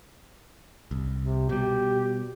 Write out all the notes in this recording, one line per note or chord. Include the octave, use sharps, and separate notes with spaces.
C2
C3
B2 G3 G4